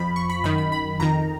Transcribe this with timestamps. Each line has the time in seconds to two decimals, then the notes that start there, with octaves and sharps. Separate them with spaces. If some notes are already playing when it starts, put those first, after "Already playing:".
Already playing: F2 F3 B5
0.16 C#6
0.30 B5
0.44 F#2 D#3 B5
0.58 B5
0.72 B5
1.00 F2 D#3 A#5